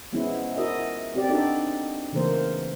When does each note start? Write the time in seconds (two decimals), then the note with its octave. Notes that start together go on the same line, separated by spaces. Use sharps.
0.12 F3 G#3 B3 C#4 E4
0.57 E4 F#4 A#4 D#5 E5
1.14 C4 G4 D5
1.29 D4 D#4 F#4 A4 D5
2.12 C#3 E3 A3 A#3 A#4 C5